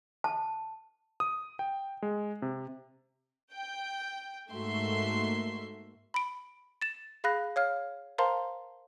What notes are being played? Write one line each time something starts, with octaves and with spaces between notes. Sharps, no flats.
A5
D#6
G5
G#3
C3
G5
G#2 A3 A#3 F#4 E5 C6
B5 D7
A6 E7
G#4 F5 B5 F#6 A#6
C#5 F5 F6
A#4 C5 F5 A5 A#5 C6